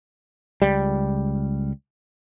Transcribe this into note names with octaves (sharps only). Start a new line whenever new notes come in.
C#2 G3